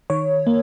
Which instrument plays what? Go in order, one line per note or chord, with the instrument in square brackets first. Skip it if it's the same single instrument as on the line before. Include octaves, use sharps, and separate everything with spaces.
[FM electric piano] D#3 C#5
A#3